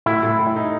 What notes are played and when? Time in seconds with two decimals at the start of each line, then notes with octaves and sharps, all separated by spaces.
0.06 A2 E4
0.23 A2
0.39 A2
0.56 D#4